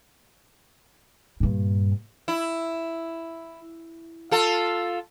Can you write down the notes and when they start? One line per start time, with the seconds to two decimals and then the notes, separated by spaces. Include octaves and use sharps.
1.40 G2 A#2
2.28 E4
4.31 F4 A4